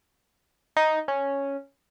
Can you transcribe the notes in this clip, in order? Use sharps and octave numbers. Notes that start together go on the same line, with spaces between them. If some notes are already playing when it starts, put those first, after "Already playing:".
D#4
C#4